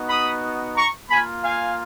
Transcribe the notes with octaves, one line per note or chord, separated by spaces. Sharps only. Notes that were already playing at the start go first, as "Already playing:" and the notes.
Already playing: B3 D#4 F#4
B5 D#6
A#5 C#6
A#3 F4 G#5 B5
F5 G#5